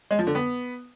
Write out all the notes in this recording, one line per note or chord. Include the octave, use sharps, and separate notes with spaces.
G#3
F3
D3
B3